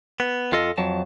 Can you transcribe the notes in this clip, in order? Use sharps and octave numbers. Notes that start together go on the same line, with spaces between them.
B3
F2 F4 A4 D#5
F2 F#3 A5